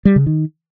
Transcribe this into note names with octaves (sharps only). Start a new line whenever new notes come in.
G3
C#3
D#3